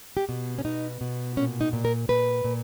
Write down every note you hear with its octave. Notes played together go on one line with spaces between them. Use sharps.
G4
B2
C#4
B2 D#4
B2
A#2 C#4
D#4
A#2
A#4
A#2 B4
A#2